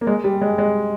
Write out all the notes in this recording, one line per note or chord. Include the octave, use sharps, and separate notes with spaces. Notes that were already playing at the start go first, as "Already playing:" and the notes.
A#3
G#3
G3
G#3
G#3